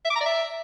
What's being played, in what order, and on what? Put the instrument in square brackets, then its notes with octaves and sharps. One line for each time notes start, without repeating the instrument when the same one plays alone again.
[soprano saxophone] E5
D6
A#5
D5
E5